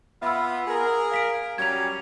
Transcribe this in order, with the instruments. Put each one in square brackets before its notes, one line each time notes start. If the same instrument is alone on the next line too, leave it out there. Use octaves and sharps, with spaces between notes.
[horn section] B3 F4 [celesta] E5 B5 E6
[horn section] G#4 A#4
[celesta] F5 B6 D7
[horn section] F#3 G3 C#4 [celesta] G#6 F7